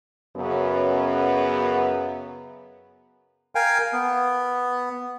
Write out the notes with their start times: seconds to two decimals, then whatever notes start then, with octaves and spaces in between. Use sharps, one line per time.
0.36 F#2 C#3 F#3 B3
3.55 A#4 F5 G5 G#5
3.93 B3